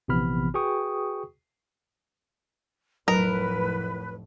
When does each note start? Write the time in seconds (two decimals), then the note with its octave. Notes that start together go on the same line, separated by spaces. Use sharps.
0.08 A#1 C3 E3 B3 B5 F6
0.54 F#4 G#4 B4 G5 C#6 D#6
3.08 F1 A2 F#3 A#4 B4